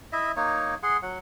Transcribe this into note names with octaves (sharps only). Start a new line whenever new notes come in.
E4 D#5 E5
A#3 D#4 C#5
G#4 F#5 C6
F#3 F#5